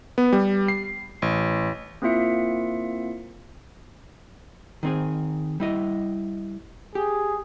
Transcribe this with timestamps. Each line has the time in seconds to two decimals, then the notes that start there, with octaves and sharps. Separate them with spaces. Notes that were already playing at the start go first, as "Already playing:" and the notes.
0.18 B3
0.33 G3
0.68 C7
1.22 A1
2.02 A#3 C4 E4 F4 E5 C#7
4.83 D#3 C4 G#4
5.60 G3 E4 D#5
6.95 G4 G#4